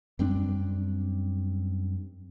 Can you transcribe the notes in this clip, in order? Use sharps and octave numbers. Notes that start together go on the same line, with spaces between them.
F#2 G3 C4 D4